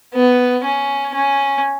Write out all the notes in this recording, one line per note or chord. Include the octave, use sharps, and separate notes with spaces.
B3
C#4
C#4